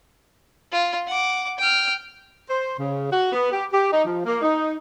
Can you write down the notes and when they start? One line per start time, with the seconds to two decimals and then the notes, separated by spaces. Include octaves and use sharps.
0.72 F4
1.07 F#5 D6
1.58 G5 F6
2.49 C5
2.78 C#3
3.11 F#4
3.32 B3
3.51 G4
3.71 G4
3.91 D#4
4.05 F3
4.25 A#3
4.42 D#4